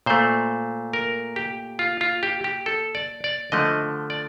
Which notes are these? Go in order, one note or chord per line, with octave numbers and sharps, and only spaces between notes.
A#2 A3 C5
A#4
G4
F4
F4
G4
G4
A4
D5
D5
D3 F3 A3 D#5
D5